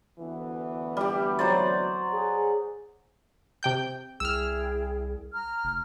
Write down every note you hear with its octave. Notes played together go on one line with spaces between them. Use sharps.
D2 E3 B3
G3 G4
F#3 C5 D5
G#4
C3 G5 G6
C2 E4 G#4 G5 E6 F6
A#5 F6
F1